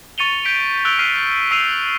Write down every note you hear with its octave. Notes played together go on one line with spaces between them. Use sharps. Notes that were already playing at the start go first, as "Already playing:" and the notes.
C#6 A6 C#7 D#7 F7 G7
G6 B6 D7
E6 F#6 D7 F7 G7
F6 F#6 B6 C7 D#7
E6 B6 C7 D#7 F7